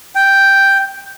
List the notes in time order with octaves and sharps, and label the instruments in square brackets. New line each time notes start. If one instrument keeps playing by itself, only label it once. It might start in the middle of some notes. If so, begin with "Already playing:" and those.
[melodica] G5